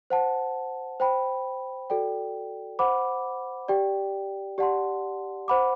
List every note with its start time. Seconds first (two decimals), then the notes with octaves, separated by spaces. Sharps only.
0.10 C5 F#5 A5
1.00 C5 G5 B5
1.90 F#4 A4 D5 G5
2.79 C5 F#5 B5 D6
3.68 G4 D5 G5
4.58 G4 D5 F#5 A5 C6
5.48 C5 F#5 B5 D6